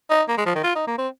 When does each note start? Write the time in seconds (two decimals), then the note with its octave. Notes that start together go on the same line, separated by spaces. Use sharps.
0.10 D#4
0.28 A#3
0.37 G#3
0.46 F3
0.55 D#3
0.63 F4
0.75 D#4
0.87 A#3
0.98 C4